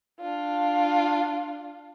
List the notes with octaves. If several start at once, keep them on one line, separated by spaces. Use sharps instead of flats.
D4 F4